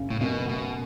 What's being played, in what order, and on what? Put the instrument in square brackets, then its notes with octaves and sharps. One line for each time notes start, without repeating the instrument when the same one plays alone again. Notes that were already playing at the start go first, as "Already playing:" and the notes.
Already playing: [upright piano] F#1 C#3
[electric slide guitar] A2
[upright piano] F#2 [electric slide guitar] B2
[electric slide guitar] B2 [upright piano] A3